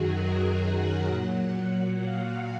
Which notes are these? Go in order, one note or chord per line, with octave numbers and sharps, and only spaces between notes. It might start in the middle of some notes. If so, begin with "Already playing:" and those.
Already playing: F#2 D#3 F#3 F#4 G#4
A#4
G#4
F#5
A#2 F#3 F#5
F#5
F5